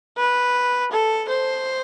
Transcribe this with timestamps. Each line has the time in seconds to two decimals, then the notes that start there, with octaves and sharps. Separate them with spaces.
0.18 B4
0.91 A4
1.29 C5